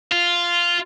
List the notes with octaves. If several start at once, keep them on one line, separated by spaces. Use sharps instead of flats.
F4